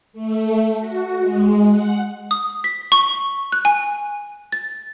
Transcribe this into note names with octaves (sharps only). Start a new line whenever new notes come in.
A3
F#4
G#3
F#5
D#6
B6
C#6
F#6
G#5
A6